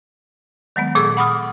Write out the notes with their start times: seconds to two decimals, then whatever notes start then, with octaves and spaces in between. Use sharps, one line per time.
0.76 D#3 F#3 G#3 B3
0.95 A#2 G#4 A4 C#6 E6
1.17 F#5 B5 D6 D#6 F6